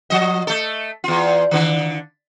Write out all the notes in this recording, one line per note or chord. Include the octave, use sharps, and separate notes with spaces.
F3 D#5
A3 A4
E2 F4
D3 D#3